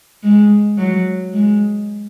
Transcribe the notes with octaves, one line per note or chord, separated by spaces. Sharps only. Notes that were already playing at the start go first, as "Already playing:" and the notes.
G#3
F#3
G#3